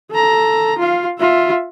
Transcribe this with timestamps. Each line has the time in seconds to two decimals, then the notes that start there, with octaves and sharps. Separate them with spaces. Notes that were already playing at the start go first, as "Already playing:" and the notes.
0.11 A4 A#5
0.78 F4 F5
1.19 F4 E5